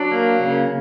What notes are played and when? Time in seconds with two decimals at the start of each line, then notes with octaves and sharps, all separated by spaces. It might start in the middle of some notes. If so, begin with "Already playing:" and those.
Already playing: F#3 D4
0.12 A#3
0.40 C#3